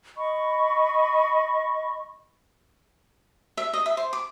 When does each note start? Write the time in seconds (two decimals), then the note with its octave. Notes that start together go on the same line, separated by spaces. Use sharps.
0.17 D#5 B5 C#6
3.57 E5
3.73 D#5
3.86 E5
3.97 C5
4.13 D6